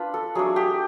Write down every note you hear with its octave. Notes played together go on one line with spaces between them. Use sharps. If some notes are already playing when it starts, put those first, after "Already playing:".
Already playing: D4 F4 B4
A4
F#3 A3 D4 G#4
G4